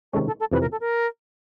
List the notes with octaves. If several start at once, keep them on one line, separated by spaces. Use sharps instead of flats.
C3 D#3 G#3 C#4 A4
A4
A4
F2 C3 E3 B4
A#4
A4
A#4